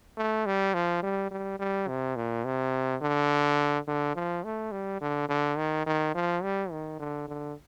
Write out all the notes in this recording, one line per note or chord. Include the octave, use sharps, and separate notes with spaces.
A3
G3
F3
G3
G3
G3
C3
A#2
C3
D3
D3
F3
A3
G3
D3
D3
D#3
D#3
F3
G3
D#3
D3
D3